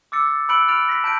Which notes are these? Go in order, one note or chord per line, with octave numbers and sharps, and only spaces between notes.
D6 E6 A6 C#7
A6
B5 E6 F#6 C#7 D7 F#7
F6 A6 D7 F7
A#6 B6
A5 G6 D7